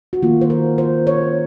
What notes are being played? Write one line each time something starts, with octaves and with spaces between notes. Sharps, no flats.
F#4
D#3 A#3 F4
C5
A#4
C5
C#5